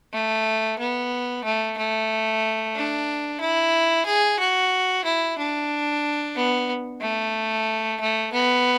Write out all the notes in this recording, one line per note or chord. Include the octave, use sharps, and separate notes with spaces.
A3
B3
A3
A3
D4
E4
G#4
F#4
E4
D4
B3
A3
A3
B3